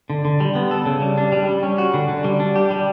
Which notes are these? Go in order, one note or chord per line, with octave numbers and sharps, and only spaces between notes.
D3
D3
G3
B3
A4
C#3
G3
D4
G3
G3
C#4
F#4
D3
D3
G3
D4
G4
G3